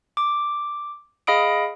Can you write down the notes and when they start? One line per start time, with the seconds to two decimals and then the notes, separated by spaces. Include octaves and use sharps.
0.17 D6
1.27 G#4 D#5 F5 B5 D#6 D7